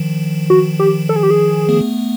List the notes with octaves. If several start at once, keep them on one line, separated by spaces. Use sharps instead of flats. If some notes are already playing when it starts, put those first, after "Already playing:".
Already playing: D#3 F3
F#4
G4
A4
G#4
G4
G#4
A3 B3